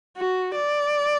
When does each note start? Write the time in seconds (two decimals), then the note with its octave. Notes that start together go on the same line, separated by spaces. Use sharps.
0.17 F#4
0.55 D5